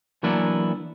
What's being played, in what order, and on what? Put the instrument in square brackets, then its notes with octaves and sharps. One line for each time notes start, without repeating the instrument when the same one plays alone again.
[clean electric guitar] E3 F#3 A#3 B3 D4 E4